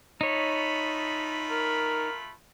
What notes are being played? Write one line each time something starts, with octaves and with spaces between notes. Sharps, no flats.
A3 D#4 F4 C#5 B5
A#4